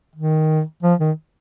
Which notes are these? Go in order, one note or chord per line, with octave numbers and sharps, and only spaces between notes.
D#3
F3
D#3